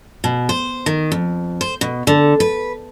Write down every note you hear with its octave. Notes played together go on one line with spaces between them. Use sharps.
B2
C5
D#3
F2
C5
B2
D3
B4